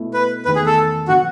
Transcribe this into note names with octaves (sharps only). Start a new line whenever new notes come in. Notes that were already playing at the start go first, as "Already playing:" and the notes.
Already playing: B2 A3 E4
B4
E2 D#3 A3 B4
G#4
A4
B2 F#3 F#4